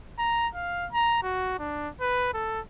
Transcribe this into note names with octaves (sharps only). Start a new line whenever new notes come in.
A#5
F5
A#5
F#4
D4
B4
A4